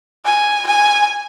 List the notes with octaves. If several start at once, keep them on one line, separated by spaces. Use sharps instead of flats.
G#5
G#5